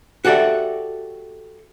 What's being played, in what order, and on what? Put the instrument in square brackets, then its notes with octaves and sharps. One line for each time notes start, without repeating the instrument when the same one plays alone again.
[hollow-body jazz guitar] F#4 G4 A4 D5 E5